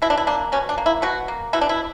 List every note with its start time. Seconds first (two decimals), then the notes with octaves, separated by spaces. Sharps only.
0.02 B2 E4
0.10 D4
0.17 E4
0.27 A#3 D4
0.52 B2 C#4
0.69 D4
0.78 A#3
0.86 E4
1.02 B2 F#4
1.28 A#3
1.53 B2 E4
1.61 D4
1.69 E4